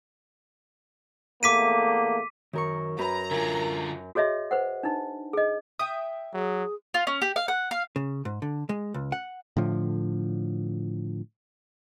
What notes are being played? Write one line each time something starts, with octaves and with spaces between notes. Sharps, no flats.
E2 A3 A#3 D6 B6 D#7
F#2 D#3 A#4 C#6
F#2 B4 A#5
D3 F4 A#4 E5 G#5
F#4 G#4 C#5 D#5 E5
B4 C5 F#5
D4 D#4
G#4 D#5
E5 G5 D#6
F#3 G#4
F4
C#4
G4
F5
F#5
F5
C#3
G#2
D3
G#3
C#2
F#5
A2 D3 F3